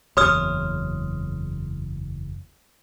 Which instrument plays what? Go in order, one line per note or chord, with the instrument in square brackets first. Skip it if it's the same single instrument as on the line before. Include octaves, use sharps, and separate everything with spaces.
[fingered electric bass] F#1 E2 [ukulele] C#5 [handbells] C6 D#6 F6